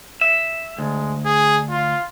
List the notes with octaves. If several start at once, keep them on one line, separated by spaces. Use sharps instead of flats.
E5
D2 G#3
G#4
F4